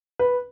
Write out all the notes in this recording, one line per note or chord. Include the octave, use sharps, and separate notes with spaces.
B4